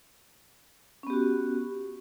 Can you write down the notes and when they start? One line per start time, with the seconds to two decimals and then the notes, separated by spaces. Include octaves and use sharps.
1.03 C#4
1.07 B3
1.10 G4
1.13 F#4